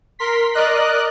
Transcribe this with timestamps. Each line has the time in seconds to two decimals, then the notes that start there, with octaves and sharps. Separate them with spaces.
0.19 A#4 C6 B6
0.54 A#4 D5 D#5 F#6